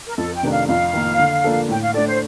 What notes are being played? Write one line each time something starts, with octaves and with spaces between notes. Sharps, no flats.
A#4
F2 A4
G5
C3 D#3 A3 D4
F5
F2 F5
D#3 A#3
D3
F3 A#3 D4 A4
A2 G5
F5
A3 D4 A4 D5
C5